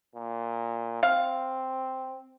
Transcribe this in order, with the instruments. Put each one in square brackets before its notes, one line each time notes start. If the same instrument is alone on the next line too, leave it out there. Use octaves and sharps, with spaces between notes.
[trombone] A#2
[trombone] C4 [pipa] F5